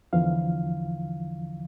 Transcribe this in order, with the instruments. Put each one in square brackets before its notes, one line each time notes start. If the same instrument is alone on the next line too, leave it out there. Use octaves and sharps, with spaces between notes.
[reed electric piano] E2 D3 E3 F3 F5